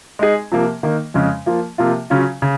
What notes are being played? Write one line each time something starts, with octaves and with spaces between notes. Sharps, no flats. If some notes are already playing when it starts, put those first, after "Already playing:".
G#3 D#4 G#4
C3 F3 A#3
D#3 A#3 D#4
F2 C#3 G#3 C#4
F3 A#3 F4
C3 F3 A#3 F4
C#3 F#3 C#4 F4
C#3